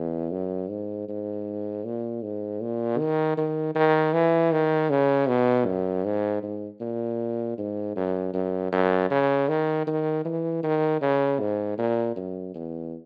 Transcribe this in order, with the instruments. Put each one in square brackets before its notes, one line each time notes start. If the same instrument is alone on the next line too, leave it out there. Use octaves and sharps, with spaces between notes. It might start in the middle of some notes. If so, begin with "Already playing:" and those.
Already playing: [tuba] E2
F#2
G#2
G#2
A#2
G#2
A#2
D#3
D#3
D#3
E3
D#3
C#3
B2
F#2
G#2
G#2
A#2
G#2
F#2
F#2
F#2
C#3
D#3
D#3
E3
D#3
C#3
G#2
A#2
F#2
E2